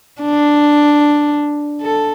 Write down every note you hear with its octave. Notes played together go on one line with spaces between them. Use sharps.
D4
A4